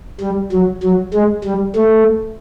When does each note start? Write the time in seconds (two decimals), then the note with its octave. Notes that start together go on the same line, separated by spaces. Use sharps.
0.21 G3
0.52 F#3
0.83 F#3
1.14 G#3
1.44 G3
1.76 A3